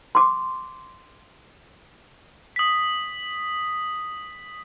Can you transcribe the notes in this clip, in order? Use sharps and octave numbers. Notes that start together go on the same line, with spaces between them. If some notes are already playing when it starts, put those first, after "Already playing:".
C6 D6
D#6 B6